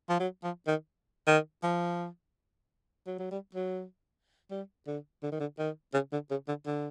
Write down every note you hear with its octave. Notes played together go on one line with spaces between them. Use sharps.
F3
F#3
F3
D#3
D#3
F3
F#3
F#3
G3
F#3
G3
D3
D3
D#3
D3
D#3
C#3
D3
C#3
D3
D3